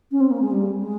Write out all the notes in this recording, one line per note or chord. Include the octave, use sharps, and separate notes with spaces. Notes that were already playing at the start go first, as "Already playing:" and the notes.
C#4
C4
A#3
G#3
G3
G#3